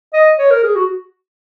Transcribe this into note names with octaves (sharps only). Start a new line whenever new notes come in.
D#5
C#5
A#4
G#4
F#4